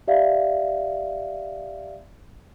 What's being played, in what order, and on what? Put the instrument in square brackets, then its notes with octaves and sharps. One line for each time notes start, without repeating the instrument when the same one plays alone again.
[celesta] G4 D5 E5 F5